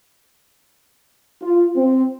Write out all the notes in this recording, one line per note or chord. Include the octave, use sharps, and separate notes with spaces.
F4
C4